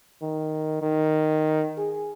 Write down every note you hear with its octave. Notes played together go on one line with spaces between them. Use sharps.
D#3
D#3
G#4